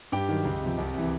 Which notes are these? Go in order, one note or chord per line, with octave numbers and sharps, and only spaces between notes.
G2 G4 G5
D#3 F#3
C#2
C3 F3
C2
C3 E3